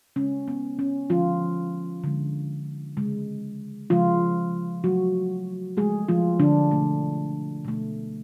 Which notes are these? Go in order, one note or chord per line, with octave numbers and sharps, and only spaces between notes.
C#3 G#3 C#4
B3
C#4
D3 F3 G#3 F4
D3 G#3
C#3 G#3
C#3 F3 G#3 F4
C#3 F3 F#3 A3 F#4
C#3 F3 G#3 A3 G#4
F3 F4
D3 D4
B2 A3
B2 A3